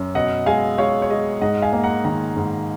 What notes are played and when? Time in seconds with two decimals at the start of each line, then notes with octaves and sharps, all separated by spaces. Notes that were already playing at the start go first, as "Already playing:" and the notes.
Already playing: F#2
0.15 B2 D#5 F#5
0.46 G#3 F5 G#5
0.78 G#3 C#5 F5
1.02 C#5
1.10 G#3 D#5
1.41 G#2 D#5 F#5
1.62 F5 G#5
1.73 A#3
1.84 F#5 A#5
2.05 D#3 F#5 A#5
2.37 G#2